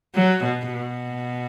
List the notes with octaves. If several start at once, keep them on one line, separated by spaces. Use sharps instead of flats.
F#3
B2
B2